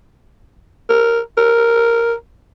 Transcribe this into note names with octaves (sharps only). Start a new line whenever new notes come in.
A#4
A#4